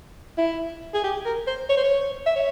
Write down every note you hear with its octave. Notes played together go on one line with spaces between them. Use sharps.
E4
G#4
G4
A#4
C5
C#5
C5
C#5
E5
C#5